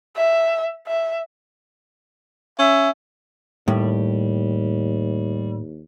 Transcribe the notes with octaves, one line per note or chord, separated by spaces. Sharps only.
E5
E5
C#4 E5
D#2 A2 G3